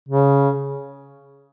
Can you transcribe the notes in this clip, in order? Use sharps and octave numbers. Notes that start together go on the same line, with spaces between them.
C#3